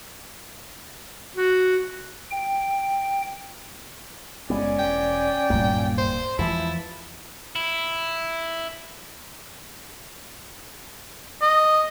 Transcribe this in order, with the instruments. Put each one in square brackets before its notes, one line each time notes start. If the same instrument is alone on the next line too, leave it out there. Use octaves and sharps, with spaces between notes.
[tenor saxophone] F#4
[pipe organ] G5
[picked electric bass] F#1 G#3 B3 [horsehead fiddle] C#4 D5
[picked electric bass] E1 [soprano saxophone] G5
[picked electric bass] D1 A#3 [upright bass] G2 A#2
[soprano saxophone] C5
[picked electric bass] E2 E3 F3 [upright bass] G#3 [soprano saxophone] E4 [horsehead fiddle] A5
[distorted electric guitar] E4
[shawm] D#5